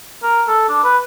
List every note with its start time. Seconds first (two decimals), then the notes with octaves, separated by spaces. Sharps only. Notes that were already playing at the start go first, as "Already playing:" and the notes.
0.23 A#4
0.47 A4
0.69 D4
0.84 B4